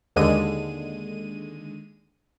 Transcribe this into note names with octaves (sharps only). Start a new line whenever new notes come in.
D#2 D3 G#3 D#7